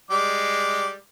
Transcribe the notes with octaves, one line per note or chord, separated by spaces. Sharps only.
G3 G#3 D6